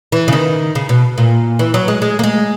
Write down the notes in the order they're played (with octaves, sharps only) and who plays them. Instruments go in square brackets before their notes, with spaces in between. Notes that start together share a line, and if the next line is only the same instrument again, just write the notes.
[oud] E3
C#3
D#3
C#3
B2
A#2
E3
F#3
G#3
G#3
A#3
G#3